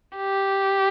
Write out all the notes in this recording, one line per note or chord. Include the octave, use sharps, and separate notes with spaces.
G4